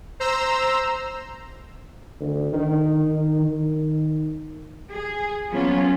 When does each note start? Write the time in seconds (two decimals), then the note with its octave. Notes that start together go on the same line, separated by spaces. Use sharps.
0.20 C5 A#5 E6
2.21 D2
2.52 D#3
3.02 D#3
3.42 D#3
4.91 G#4
5.51 F3 F#3 A#3 B3 C#4 F4